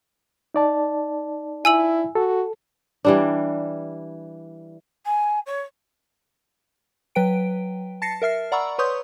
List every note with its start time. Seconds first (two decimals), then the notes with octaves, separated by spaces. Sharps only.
0.54 D#4 D5 A5
1.65 E4 G#5 E6 F#7
2.15 F#4 A4
3.05 E3 G3 D4
5.06 G#5
5.46 C#5
7.15 F#3 B4 G5 D7
8.02 A5 A6 A#6 C7 C#7
8.22 A#4 E5 F6 C7
8.52 D5 F#5 A#5 B5 C#6 E6
8.78 B4 C#5 C6 C#6 D#6 G6